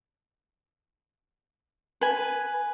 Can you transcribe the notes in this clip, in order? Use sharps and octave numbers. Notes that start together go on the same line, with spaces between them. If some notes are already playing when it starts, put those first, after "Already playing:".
B4 G#5